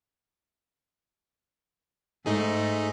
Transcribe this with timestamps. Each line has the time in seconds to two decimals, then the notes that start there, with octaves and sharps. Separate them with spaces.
2.26 G#2 A3 D#4 G#4